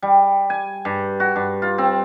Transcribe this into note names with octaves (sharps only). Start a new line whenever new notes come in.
G3
G#5
G2
F#4
G2
F4
C4